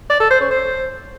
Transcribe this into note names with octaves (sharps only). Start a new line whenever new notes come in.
D5
A4
C5
C#4
C5